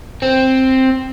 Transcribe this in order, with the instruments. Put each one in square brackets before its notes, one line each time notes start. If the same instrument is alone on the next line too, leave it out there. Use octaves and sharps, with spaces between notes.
[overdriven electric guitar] C4